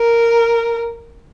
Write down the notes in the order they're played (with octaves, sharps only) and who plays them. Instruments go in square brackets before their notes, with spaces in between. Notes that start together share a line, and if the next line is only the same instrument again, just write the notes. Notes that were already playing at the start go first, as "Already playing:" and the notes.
Already playing: [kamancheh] A#4